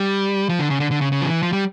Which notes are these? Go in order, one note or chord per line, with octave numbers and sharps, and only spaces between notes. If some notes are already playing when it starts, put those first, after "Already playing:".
Already playing: G3
F3
D3
C#3
D3
D3
C#3
C#3
F3
E3
F3
G3